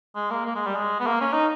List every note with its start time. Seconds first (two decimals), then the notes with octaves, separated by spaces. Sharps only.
0.16 G#3
0.31 A#3
0.46 A#3
0.56 G#3
0.67 G3
0.75 G#3
1.00 B3
1.07 A#3
1.21 C#4
1.33 D#4